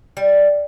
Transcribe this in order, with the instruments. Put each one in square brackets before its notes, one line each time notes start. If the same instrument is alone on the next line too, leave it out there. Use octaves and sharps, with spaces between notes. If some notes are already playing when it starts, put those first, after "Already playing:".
[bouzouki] G3